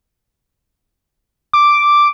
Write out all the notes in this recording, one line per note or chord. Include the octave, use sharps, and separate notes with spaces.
D6